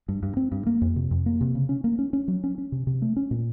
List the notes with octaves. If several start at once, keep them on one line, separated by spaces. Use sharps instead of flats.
G2
G2
C4
G2
A#3
F2
C3
F2
A#3
C3
C#3
C#4
A#3
C#4
C#4
F#3
C#4
C#4
C3
C3
A3
C#4
A#2